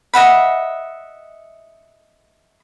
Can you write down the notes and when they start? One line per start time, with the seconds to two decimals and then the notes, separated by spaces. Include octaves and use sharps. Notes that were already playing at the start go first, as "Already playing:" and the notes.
0.14 D#5 E5 F#5 B5